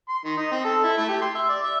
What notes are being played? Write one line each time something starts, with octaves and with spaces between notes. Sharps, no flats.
C6
D#3
D#4
C4
A4
E4
A3
G4
C6
E5
D5
E5